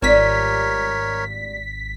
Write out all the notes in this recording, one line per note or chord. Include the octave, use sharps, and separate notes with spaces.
G#1 G3 D4 F4 A#4 C#5 B6